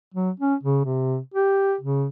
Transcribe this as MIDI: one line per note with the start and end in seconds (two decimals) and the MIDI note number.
0.14 0.30 54
0.40 0.55 61
0.63 0.80 49
0.85 1.17 48
1.34 1.75 67
1.81 2.07 49